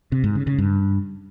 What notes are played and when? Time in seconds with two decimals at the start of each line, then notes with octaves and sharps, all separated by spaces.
0.12 C3
0.24 G#2
0.35 C#3
0.47 C#3
0.58 G2